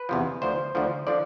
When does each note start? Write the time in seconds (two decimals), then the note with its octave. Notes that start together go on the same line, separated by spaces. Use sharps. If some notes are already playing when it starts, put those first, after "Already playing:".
Already playing: B4
0.09 E2 C3 F3
0.42 D2 D3 F3 C5
0.75 D2 D3 F3
1.07 D3 F3 D5